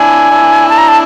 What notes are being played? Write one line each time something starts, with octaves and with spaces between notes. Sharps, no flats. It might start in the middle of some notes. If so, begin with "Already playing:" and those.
Already playing: D4 E4 G#5
D4 E4
A5
A#5
A5